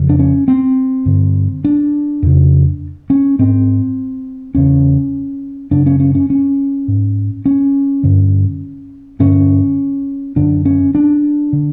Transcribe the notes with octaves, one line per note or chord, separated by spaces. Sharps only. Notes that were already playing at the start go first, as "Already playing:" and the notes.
Already playing: F2 C#3
D4
C#4
C4
G2 D3
D4
F2 C#3
C#4
G#2 C4
E2 C#3 C#4
F#2 C#3 D4
C#4
C#4
C#4
C#4
G#2
C#4
G2 D3
G2 D3 C#4
F#2 D3 D4
C#4
D4
D3